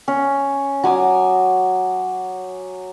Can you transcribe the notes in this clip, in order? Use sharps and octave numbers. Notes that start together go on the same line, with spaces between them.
C#4
F#3 G#5 D6 D#6